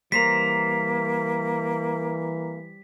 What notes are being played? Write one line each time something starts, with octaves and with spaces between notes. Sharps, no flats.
E3 G3 A#3 C5 A#5 B6